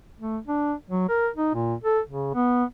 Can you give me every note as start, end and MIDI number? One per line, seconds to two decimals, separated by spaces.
0.20 0.38 57
0.47 0.73 62
0.90 1.06 54
1.09 1.29 70
1.37 1.51 63
1.54 1.75 46
1.84 2.00 69
2.10 2.34 49
2.35 2.64 59